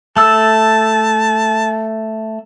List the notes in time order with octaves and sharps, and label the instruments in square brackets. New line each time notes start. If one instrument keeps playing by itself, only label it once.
[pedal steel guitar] A3 E6 [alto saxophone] A5